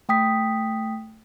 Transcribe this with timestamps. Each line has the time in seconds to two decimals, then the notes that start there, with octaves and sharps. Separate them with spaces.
0.09 A3 G5 D#6 B6